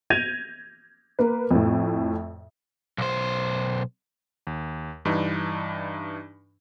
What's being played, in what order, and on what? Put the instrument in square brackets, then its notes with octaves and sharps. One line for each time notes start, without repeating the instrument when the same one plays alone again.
[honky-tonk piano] G6 G#6 A#6 D#7 F7
A#3 B4
F2 A2
[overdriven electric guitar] B1 C5
[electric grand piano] D#2
G2 E3 D4 D#4